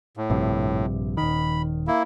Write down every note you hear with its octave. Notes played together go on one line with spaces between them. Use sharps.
A2
A#1 G2 C3
D#1 D#3 B5
A#3 E4